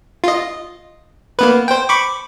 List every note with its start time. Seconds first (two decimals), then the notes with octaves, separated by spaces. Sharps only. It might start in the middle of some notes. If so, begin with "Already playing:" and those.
0.24 F4 D#5
1.39 A#3 B3 B4
1.68 C5 G5
1.89 B5 C#6 D6